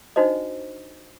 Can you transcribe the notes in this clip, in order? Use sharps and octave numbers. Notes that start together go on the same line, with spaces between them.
D4 D#4 F#4 C5 D#5